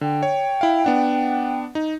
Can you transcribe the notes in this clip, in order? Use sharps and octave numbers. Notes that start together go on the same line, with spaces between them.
D3 G5
C#5
E4 F5
B3 D4 F#5
D#4